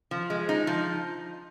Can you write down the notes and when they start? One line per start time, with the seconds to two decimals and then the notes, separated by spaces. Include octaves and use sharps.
0.11 F3
0.30 G#3
0.49 D#4
0.67 F3